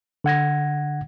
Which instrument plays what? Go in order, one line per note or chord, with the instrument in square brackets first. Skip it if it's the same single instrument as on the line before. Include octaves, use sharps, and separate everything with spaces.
[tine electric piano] D3 F#5 G#6 A#6